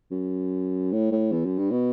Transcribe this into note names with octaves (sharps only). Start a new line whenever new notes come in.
F#2
A2
A2
E2
F#2
G2
B2